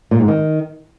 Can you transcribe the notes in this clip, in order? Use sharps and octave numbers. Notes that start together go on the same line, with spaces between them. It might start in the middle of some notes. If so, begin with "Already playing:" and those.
A#2
G#2
D#3